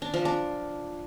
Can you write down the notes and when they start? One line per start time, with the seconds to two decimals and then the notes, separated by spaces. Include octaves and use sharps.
0.02 D4
0.14 F3
0.25 D4